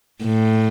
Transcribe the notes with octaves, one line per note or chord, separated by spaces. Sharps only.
A2